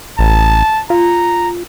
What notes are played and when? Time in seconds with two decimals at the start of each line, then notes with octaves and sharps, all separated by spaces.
0.19 A1 A5
0.90 F4 A#5